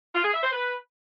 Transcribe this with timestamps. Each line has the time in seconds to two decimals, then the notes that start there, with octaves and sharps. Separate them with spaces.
0.15 F4
0.25 G#4
0.34 E5
0.43 C5
0.53 B4